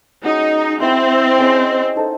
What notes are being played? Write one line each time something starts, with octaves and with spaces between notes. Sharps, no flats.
G#3 C#4 D#4 F#4
C4 E4 C5 E5
C#4 G#4 C5 D#5
D#4 A4 C5 D#5